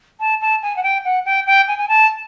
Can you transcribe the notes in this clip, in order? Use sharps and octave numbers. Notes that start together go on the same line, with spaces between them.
A5
A5
G#5
F#5
G5
F#5
G5
G5
G#5
G#5
A5